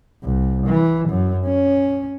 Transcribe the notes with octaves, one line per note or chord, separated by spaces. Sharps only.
C2
E3
F#2
C#4